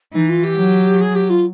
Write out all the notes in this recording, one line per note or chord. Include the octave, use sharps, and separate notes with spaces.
E3 D#4
F4
G4
F#3
G#4
G4
F4